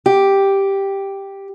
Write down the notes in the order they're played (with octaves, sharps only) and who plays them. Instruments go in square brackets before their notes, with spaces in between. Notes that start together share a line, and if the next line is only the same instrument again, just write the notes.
[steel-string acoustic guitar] G4